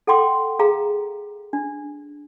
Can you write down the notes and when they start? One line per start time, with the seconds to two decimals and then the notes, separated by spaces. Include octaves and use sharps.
0.07 A4 F#5 G5 C6 D6
0.59 G#4 F5 A#5
1.53 D4